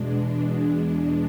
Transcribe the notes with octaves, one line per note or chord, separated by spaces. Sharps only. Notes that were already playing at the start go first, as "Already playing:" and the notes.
Already playing: E2 B2 G#3 D4